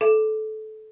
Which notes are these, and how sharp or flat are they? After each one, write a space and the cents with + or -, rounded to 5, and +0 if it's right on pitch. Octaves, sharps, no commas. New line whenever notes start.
A4 -20